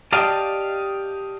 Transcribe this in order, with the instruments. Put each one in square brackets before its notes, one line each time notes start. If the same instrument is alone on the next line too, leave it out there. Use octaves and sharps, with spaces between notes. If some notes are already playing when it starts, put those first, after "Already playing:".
[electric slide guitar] G4 D5 D#5 F5 G5 A5